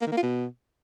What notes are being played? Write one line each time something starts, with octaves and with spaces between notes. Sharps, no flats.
A#3
D#3
A#3
F4
B2